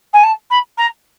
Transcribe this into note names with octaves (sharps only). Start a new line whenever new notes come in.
G#5
A5
B5
A#5